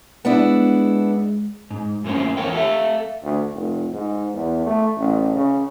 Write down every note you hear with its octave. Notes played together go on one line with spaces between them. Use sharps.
G#3 B3 D4 E4
G#2
F#2 A3 A#3 C#4 C5
E2 G2 A4 A#4 C#5 G5
A4 E5 F5
D2
F1
G#2
E2
A3
A1
C#3